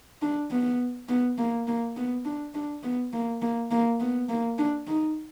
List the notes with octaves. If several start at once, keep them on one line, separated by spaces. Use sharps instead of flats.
D4
B3
B3
A#3
A#3
B3
D4
D4
B3
A#3
A#3
A#3
B3
A#3
D4
D#4